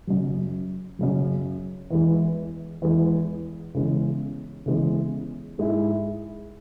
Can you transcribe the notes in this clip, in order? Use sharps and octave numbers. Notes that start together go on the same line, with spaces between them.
F#2 C#3 F#3
F#2 C#3 F#3
E2 E3 G#3
E2 E3 G#3
C#3 E3 G#3 B3
C#3 E3 G#3 B3
G#2 G#3 E4 G#4